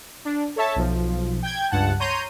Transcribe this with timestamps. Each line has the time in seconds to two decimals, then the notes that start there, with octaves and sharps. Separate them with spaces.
0.25 D4
0.56 A4 C#5 E5 A5
0.76 B1 F3
1.43 G5 G6 G#6
1.71 C#2 G2 F#5 A5
2.00 C#5 A#5 C6 G6 D#7